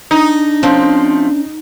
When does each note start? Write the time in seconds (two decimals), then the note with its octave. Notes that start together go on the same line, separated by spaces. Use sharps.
0.11 D4 D#4
0.63 F3 A3 C4 C#4